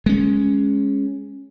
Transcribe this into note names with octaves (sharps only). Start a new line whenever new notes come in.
G#3 C#4